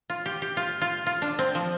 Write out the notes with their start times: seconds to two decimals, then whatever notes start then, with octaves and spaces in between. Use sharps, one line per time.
0.10 F4
0.26 G4
0.42 G4
0.57 F4
0.81 F4
1.07 F4
1.22 D4
1.39 C4
1.55 F3